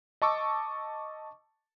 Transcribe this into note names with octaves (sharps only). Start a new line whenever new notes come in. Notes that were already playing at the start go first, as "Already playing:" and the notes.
D#5 A5 C#6 D6 E6